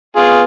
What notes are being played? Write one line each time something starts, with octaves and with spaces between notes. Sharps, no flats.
B3 F4 G#4